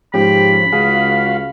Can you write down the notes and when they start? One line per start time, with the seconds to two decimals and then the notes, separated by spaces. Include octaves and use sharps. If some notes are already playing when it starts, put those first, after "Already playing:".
0.14 G#2 F3 C#4 G4 B5
0.73 C#2 F#4 G#4 F5